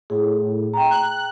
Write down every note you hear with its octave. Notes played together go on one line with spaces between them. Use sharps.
A2 G#4
G5 A#5
F#6